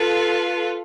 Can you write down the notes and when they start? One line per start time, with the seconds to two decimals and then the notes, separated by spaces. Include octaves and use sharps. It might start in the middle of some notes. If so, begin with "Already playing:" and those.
Already playing: F4 A4 B4